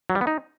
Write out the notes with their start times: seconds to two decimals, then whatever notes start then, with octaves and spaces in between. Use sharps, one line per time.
0.10 F#3
0.15 G3
0.21 B3
0.27 D#4